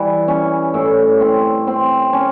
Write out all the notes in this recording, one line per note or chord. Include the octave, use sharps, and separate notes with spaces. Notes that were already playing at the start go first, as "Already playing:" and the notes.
Already playing: E3 G3
C#4
A2
C4
C4
C#4